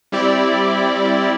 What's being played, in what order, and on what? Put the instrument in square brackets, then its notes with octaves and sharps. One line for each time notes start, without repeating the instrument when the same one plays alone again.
[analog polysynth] G3 C4 E4 G4 D5